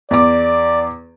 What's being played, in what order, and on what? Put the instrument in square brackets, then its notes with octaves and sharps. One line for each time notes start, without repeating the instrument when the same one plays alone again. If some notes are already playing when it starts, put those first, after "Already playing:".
[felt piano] E2 D6 [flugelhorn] D5